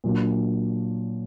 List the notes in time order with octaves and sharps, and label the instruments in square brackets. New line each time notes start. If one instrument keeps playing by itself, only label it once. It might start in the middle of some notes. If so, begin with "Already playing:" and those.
[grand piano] A#2 F#3 D4